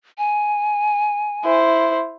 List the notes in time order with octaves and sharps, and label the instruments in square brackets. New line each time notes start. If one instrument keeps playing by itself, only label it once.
[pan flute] G#5
[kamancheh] E4 C5